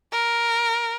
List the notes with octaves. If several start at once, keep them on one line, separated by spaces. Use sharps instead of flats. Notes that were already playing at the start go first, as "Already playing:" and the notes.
A#4